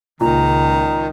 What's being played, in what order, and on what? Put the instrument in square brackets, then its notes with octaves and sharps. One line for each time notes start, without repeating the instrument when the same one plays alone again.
[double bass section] C#2 [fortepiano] A#2 [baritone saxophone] D#3 [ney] A#5